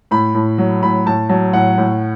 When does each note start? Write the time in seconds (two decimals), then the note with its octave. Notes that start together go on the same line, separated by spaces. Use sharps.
0.11 A2 B5
0.35 A2
0.58 F#3
0.83 A2 B5
1.06 A2 A5
1.29 F#3 A5
1.53 A2 F#5
1.78 A2